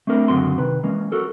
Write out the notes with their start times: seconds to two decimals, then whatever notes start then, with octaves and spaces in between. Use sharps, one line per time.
0.07 A3 C4 D4 A#4
0.28 C#2 F#2 D3 C4 F#4 C6
0.57 C3 D#3 B4
0.83 E3 G#3 A#3 C#4
1.12 F#4 A4 A#4